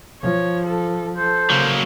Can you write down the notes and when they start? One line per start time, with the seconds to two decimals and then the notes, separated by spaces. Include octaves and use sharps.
0.23 F3 C#5
0.66 A4
1.17 A4 C5
1.50 C#3 F#3 A#3